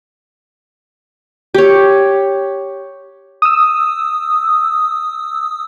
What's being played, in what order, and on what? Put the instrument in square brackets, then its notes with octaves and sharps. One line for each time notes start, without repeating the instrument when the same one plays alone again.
[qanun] G4 C#5
[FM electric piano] D#6 E6